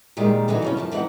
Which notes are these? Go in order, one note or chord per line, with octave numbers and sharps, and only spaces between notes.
A#2 D#3 G3 G#3
D3 E3 D#4 F#4
C#3 A3 C#4
F#2 F3 A5
D2 E3 C4 D#4 F5 F#5